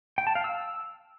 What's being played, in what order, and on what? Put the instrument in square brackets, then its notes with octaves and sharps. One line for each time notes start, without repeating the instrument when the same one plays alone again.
[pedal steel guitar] G5
A5
F5
E6